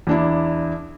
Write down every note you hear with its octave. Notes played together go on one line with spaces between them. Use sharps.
E2 D4 E4